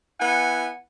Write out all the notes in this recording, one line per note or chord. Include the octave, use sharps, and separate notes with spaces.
B3 E4 F#5 G#5